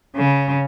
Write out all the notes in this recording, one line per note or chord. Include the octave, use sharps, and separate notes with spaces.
C#3